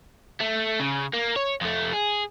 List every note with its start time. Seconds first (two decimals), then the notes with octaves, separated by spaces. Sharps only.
0.40 A3
0.80 C#3
1.14 A#3
1.36 C#5
1.61 F2 A3
1.93 G#4